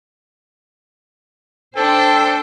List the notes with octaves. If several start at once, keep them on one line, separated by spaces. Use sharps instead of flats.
D4 A4 C5 G5